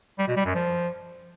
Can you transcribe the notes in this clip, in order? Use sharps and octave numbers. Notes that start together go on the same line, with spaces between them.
G3
B2
G3
F#2
F3